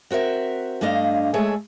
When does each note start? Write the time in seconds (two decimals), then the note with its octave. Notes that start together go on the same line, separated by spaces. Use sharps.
0.11 C4 F#4 A#4 E5
0.81 G2 A3 D4 D#5 F5
1.34 G#3 A3 G#4 A4 C#5 E5